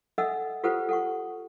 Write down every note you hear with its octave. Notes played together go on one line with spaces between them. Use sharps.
D4 A4 D#5 E5 F#5 E6
F4 G4 A4 B4 C5 F#5
A4 F#5 C#6